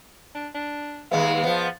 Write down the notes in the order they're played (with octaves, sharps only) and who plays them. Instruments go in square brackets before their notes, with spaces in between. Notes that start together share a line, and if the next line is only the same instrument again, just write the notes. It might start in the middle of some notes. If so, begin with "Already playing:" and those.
[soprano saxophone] D4
D4
[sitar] D#2 G#3 B3 [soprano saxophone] F5
[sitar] F3 B3